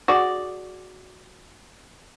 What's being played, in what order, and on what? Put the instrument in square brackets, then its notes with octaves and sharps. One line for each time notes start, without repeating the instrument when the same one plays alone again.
[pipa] F#4 G#4 D5